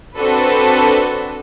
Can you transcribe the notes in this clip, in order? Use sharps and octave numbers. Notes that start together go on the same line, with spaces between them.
C4 D4 F#4 A4 B4